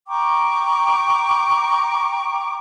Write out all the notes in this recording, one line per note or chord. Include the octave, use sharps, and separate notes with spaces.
G5 A#5 C#6 D6